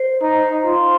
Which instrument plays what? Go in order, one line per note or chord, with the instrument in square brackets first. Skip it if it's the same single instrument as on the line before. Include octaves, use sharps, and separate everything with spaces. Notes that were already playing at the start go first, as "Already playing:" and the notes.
Already playing: [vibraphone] C5
[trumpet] D#4
F4